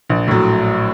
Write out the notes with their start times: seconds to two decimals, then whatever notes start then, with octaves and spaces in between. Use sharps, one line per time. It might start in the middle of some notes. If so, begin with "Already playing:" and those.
0.10 A#1
0.28 A2 F#3